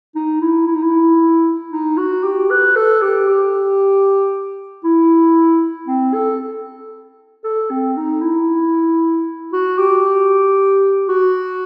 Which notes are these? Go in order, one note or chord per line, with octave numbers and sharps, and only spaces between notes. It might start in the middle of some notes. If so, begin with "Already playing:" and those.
D#4
E4
E4
D#4
E4
D#4
F#4
G4
B4
A4
G4
G4
E4
C4
A4
A4
C4
D#4
E4
F#4
G4
F#4